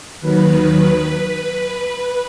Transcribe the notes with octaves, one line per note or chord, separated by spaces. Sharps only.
D#2 D#3 F#3 B4